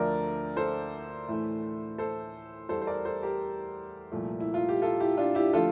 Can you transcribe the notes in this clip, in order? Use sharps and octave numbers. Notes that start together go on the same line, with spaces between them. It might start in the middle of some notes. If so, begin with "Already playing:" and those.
Already playing: D2 D3 F3 A3 A#4 D5
A4 C5
A2 E3 A3
A4 C5
E2 E3 G3 A4 C5
C5
A#4 D5
A4 C5
G4 A#4
C2 A#2 F3 A3
E4
F4
G4
F4 A4
E4 G4
D4 F4
E4 G4
D3 F3 A3 F4 A4